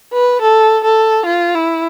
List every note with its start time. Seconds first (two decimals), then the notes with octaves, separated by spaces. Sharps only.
0.13 B4
0.41 A4
0.84 A4
1.26 F4
1.55 E4